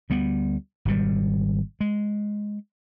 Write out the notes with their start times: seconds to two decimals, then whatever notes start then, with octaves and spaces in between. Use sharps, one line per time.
0.10 D2 G3 B3
0.85 G#1 B2 G3
1.81 G#3